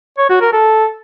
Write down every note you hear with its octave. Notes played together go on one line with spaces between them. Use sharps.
C#5
F#4
A#4
A4